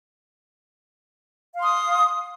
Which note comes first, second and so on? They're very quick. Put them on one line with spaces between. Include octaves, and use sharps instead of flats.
F5 C6 D#6